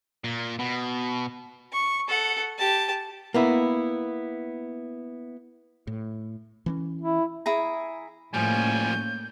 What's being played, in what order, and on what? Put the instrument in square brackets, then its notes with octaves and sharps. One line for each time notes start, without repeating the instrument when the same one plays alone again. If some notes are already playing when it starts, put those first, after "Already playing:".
[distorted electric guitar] A#2
B2
[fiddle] C#6
A4 F#5
G4 A5
[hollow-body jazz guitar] A#3 B3 E4
[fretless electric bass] A2
E3 C4 C#4
[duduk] E4
[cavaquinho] E4 G#4 A#5
[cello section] A2 A#3 C#4 [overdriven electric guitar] F3 G3 [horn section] G#5 [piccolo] G6